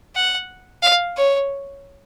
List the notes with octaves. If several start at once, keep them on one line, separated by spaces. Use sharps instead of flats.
F#5
F5
C#5